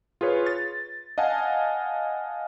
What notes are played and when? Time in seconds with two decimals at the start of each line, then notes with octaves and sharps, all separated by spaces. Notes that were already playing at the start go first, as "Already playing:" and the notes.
0.21 F4 G#4 B4 C#5
0.46 A6
1.18 D#5 F5 F#5 G#5 A5